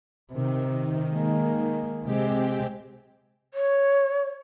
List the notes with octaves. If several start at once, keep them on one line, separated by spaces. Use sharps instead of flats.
C3 D#3
G#3 A#3
C3 G#3 C4 G4
C#5